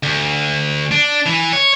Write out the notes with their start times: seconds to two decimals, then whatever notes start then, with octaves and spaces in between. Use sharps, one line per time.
0.03 D2
0.91 D4
1.26 E3
1.53 C#5